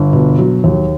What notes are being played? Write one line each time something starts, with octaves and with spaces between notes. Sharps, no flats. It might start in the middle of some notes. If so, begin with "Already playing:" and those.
Already playing: G1
B2
F#3
D#2